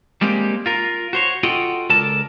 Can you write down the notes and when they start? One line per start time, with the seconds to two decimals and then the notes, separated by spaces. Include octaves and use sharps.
0.21 G3 G#3 A#3 C4 G4
0.66 F4 A#4
1.13 F#4 C5 C#5
1.43 F4 F#4 A4 D#5 F#5 G5
1.89 C#2 A4 A#4 D5 A5